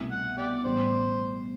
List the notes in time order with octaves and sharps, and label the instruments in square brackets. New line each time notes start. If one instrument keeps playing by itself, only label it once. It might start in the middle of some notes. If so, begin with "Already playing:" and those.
Already playing: [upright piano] C2 B2 A3 E4
[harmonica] F#5
G4 D5
[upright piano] A1 A2 G3 B3 [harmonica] C5